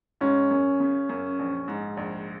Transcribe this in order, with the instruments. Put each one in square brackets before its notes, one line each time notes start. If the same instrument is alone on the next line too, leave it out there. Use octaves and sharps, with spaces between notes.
[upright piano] G#2 [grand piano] C#4
[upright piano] F#2
C#3
F#2
A#1
G#2
A#1